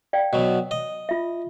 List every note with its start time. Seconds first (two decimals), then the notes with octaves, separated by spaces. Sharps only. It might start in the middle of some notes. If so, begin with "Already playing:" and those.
0.13 D5 F5 G5
0.33 B2 F#3
0.71 D#5
1.09 F4 E5